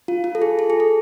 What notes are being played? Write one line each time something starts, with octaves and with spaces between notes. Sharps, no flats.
F4
F4
A4
G#4
A4
G#4
A4